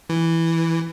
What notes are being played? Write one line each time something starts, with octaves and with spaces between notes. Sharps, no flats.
E3